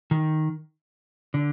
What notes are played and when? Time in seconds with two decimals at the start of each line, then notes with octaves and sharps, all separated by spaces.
0.11 D#3
1.34 D3